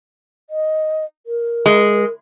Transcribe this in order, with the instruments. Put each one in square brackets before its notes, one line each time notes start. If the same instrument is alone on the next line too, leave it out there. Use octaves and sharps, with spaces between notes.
[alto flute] D#5
A#4
[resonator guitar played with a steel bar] G#3